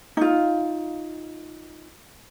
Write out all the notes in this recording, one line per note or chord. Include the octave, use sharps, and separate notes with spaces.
D#4 F4